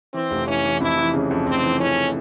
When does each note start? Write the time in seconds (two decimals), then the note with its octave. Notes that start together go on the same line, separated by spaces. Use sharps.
0.14 E3 C4
0.31 F1
0.47 E3 C#4
0.65 E3
0.80 F2 E4
0.98 E3
1.14 C#3
1.31 F2
1.47 F1 C4
1.63 E3
1.80 E3 C#4